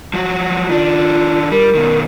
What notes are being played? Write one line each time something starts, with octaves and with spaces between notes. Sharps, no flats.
F3 F#3 F#4
D#3 D4 F4
G3 A#4
B2 D#3